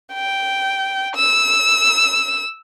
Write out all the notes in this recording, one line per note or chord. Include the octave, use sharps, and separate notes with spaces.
G5
E6